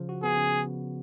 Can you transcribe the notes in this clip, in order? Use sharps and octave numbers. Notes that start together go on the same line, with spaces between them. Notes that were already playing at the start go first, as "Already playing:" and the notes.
Already playing: C#3 F3
F#4
B3 G#4
C#3